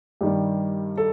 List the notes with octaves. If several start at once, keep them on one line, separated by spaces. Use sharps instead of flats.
G2 D#3 G3 G4
A4